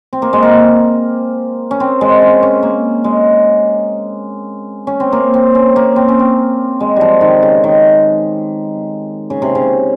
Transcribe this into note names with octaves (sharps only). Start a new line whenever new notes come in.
C4
A#3
G#3
A#3
C#4
C4
G#3
C#4
C#4
A#3
G#3
C#4
C4
A#3
C4
C#4
A#3
C4
C#4
C4
G#3
F3 G3
D#3
C#3
D#3
C#3
C3
C#3